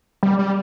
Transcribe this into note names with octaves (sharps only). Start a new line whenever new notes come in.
G3
G3